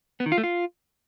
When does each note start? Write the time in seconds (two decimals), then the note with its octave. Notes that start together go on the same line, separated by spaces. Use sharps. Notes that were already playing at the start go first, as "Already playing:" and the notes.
0.20 B3
0.26 D#3
0.32 F4
0.38 A3
0.44 F4